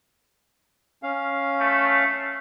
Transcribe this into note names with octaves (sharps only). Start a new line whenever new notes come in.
C#4 F5
A3